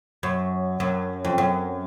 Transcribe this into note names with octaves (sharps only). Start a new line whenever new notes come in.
F#2
F#2
F2
F#2